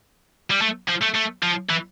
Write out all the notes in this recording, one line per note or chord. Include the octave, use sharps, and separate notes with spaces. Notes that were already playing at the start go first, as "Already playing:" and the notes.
G3
A3
F3
A3
A3
F3
E3